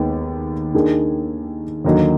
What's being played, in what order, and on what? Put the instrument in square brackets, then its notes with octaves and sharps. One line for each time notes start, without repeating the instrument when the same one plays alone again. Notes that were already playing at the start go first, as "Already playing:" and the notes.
Already playing: [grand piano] D#2 D#3 G#3 B3
D#2 D#3 A#3 D4 G#4
D#2 D3 F#3 A#3 D#4